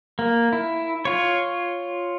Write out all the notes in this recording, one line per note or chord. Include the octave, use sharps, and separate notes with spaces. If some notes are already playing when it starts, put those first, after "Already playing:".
A#3
E4
F4 C#5